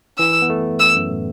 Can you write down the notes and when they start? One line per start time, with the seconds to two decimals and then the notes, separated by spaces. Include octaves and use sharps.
0.19 E3 E6
0.42 B3
0.50 A3
0.80 E6
0.95 F#2
1.10 A2